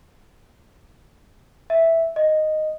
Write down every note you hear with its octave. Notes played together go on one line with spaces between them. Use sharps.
E5
D#5